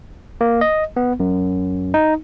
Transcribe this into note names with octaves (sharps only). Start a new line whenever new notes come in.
A#3
D#5
B3
F#2
D#4